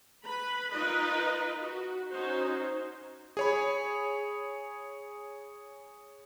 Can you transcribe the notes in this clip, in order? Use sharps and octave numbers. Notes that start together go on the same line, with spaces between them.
B4 B5
D#4 F4 A#4 B4 D#5
F#4
C#4 D#4 F#4 C5
G#4 C#5 B5